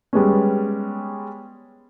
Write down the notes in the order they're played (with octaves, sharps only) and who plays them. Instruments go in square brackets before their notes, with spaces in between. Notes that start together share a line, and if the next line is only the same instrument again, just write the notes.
[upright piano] G3 G#3 B3 C#4